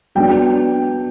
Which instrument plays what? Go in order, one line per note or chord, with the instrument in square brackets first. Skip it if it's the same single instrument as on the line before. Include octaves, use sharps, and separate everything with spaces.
[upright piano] F#3 B3 D4 G5